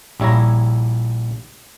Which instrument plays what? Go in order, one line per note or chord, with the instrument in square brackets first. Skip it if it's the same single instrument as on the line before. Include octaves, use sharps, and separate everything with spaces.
[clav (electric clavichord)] A#1 G3 E4 C#5 A#5